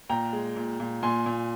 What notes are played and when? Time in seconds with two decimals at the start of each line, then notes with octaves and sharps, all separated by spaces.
0.09 A#2 G5 A#5
0.33 G#3
0.56 A#2
0.80 A#2
1.03 A#2 G#5 C6
1.26 A#2